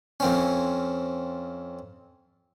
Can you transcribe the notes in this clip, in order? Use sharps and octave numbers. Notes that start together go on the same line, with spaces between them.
F2 C4 C#4